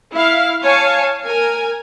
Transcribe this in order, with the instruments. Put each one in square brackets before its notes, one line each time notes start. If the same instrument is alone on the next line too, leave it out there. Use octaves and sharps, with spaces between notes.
[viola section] E4 F5
C#5 F5 G#5 A5
A#4 G#5